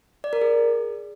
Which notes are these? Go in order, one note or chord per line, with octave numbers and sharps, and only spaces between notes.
D5
A#4
G#4